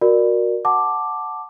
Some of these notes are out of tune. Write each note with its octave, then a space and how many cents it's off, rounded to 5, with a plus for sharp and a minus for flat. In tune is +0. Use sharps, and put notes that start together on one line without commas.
F#4 -15 A#4 +0 D5 +15
F#5 +0 A5 +0 D6 +5